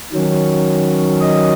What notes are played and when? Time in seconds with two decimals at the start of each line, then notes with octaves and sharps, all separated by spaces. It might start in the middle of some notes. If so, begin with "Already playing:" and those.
0.13 D#3 F#3 C#4
1.21 D#5